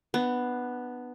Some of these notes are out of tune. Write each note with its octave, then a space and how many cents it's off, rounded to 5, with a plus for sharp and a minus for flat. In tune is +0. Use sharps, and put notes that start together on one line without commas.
B3 +0 D4 +30